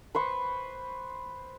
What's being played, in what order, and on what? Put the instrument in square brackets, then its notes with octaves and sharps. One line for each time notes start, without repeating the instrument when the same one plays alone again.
[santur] B4 C5 C#6